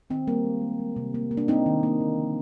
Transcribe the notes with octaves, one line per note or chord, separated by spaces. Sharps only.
D#3 C4
G3 A#3
G#3
G#3
G#3
C3
A#3
A#3
D4
A#3 C4 D#4
D#3
A#3
D3
F3